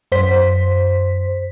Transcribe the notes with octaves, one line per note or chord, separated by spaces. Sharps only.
F#2 C5 B6